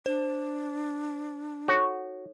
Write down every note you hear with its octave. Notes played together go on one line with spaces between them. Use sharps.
D4 C5
D#4 F#4 A4 C#5